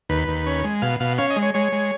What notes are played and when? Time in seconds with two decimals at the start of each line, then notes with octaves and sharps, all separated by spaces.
0.09 D#2 B4
0.28 D#2
0.46 C#4
0.64 G#3
0.82 B2 F5
1.00 B2 F5
1.18 C#4 F5
1.30 D#5
1.36 G#3
1.42 C#5
1.54 G#3 C#5
1.72 G#3